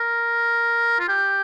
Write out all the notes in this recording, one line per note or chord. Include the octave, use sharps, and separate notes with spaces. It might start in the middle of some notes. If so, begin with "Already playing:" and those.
Already playing: A#4
F4
G4